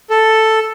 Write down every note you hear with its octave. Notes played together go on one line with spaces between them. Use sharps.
A4